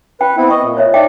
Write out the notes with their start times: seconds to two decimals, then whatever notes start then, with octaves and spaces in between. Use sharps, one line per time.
0.21 B4 G5
0.37 B3 C4 E4
0.50 D#5 C#6
0.63 A#2
0.77 C5 C#5 E5
0.94 D#4 D5 E5 G5